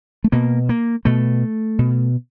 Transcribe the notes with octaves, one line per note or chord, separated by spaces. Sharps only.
A3
B2 A#3
A#3
B2 A3
B2